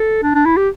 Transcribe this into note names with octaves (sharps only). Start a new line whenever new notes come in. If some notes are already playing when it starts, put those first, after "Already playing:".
Already playing: A4
D4
D4
E4
G4